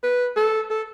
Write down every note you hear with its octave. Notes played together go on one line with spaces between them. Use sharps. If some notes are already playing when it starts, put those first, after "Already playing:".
B4
A4
A4